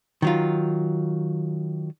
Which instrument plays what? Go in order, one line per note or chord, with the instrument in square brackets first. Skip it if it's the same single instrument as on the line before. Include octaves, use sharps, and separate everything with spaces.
[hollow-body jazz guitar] D#3 F#3 F4